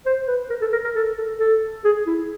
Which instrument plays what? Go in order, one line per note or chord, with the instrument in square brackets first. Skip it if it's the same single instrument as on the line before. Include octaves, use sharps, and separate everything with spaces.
[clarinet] C5
B4
A#4
A4
A#4
A#4
A4
A4
A4
G#4
E4